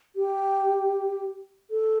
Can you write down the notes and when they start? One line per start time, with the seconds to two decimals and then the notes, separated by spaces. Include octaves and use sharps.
0.16 G4
1.71 A4